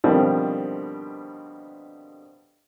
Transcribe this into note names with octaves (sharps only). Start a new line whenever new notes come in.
B2 D3 D#3 F3 G3 C4